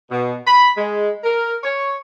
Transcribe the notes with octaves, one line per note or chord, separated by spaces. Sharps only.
B2
B5
G#3
A#4
C#5